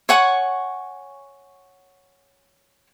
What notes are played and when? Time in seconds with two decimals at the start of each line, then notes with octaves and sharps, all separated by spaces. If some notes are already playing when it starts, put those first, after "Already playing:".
0.09 C#5 F#5 G#5 C#6